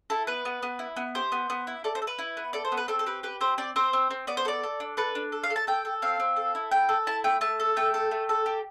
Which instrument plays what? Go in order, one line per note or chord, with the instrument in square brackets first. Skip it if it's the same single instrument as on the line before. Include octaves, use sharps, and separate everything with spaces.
[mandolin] E4 A4
B3 B4
B3
B3
E4
B3
G4 C5
B3
B3
E4
A4 D5
C5
A4
B4
E4
B3
A4 D5
C5
B3
B4
C4 A4
A4
G4 B4
G4 B4
C4 C5
C4 D5
C4 C5
C4
C4
B3 D5
C5
A4 D5
A4
D4
A4 B4
D4
A4
F5
A4
A5
A4 G5
A4
C4 F5
C4
A4
E4
A4 G5
A4
E4 A5
A3 G5
A3 A5
A4
A3 G5
A4
A3
A4
G4